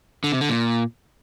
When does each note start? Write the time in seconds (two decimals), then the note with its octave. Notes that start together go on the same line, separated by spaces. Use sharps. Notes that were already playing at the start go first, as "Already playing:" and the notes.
0.24 D3
0.32 C3
0.41 D3
0.49 A#2